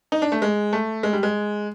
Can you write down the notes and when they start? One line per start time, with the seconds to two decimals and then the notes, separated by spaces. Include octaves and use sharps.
0.12 D#4
0.22 D4
0.32 A3
0.42 G#3
0.73 A3
1.03 G#3
1.13 G3
1.23 G#3